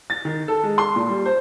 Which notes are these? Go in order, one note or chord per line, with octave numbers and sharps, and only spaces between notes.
A6
D#3
A4
G#3
C6
A#2
G3
C5